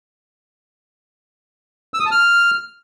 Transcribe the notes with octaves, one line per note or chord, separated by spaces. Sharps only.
E6
D#6
A5
F6